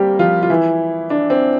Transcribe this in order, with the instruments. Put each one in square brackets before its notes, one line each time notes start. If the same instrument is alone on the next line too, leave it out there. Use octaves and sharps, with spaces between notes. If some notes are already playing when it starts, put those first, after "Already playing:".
Already playing: [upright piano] G3 A#3 C4 G4 A#4 C5
F3 F4
F4
E3 E4
D4
C4